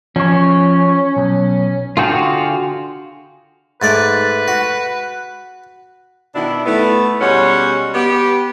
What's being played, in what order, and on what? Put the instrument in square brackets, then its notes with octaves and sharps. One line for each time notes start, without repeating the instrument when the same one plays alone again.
[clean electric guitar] F3 C#5 [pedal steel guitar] C#4
[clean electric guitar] B1
[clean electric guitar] D3 G#4 G5 [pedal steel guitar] F4 F#4 F5
[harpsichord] G#2 A3 D5 [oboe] B4
[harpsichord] F#4
[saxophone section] B2 D#3 D4 E4
A3 B3 E4
B2 G3 G#3 C#4 C#5 F#5
B3 G4